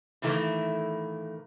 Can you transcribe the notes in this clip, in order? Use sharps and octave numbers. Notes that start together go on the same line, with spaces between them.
A2 D#3 E3 A3 A#3